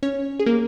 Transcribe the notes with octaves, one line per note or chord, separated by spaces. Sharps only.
C#4 C#5
G#4
A#3 A#4